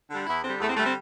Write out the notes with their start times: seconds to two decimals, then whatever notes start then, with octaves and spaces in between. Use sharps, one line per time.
0.10 D3 G3
0.27 E2 E4
0.43 D3 G3 C4
0.60 E2 A3
0.69 C4
0.76 D3 G3 A3
0.86 C4